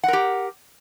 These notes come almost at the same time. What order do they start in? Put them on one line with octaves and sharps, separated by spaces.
F#5 A#4 G4